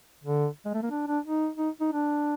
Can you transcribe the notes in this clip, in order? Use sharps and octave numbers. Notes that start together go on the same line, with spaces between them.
D3
G#3
A3
A#3
D4
D4
D#4
D#4
D#4
D4